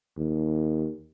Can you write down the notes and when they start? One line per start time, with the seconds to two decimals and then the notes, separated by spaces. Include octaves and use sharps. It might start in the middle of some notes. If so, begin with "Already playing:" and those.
0.17 D#2